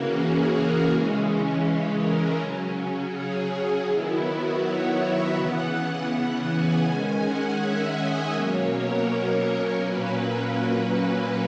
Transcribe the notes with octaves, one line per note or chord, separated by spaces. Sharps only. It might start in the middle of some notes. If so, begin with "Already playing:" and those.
Already playing: C#3 E3 A#3 C#4 F#4
G#4
A#4
C#3 E3 G#3 C#4
A#4
C#3 F#3 C#4
G#4
D#3 F#3 B3 E4
F#4
C#5
E5
C#3 E3 B3 F#5
F#5
G#5
D#3 G#3 C#4 G#5
F#5
E5
D#5
B2 F#3 A#3 C#4 C#5
A#4
A#2 F#3 A#3 C#4 B4